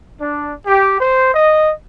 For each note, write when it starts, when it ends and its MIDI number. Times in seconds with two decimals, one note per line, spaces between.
0.21 0.53 62
0.66 0.97 67
0.99 1.33 72
1.34 1.70 75